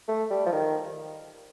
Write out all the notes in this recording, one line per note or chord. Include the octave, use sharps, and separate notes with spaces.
A3
G3
F3
D#3